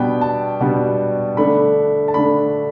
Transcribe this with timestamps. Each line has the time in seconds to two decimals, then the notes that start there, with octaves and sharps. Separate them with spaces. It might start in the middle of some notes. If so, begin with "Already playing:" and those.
Already playing: B2 G3 B3 D4 G5
0.21 A5
0.60 B2 G3 B3 D4
1.37 D3 A3 D4 B5
2.08 A5
2.14 D3 A3 D4 B5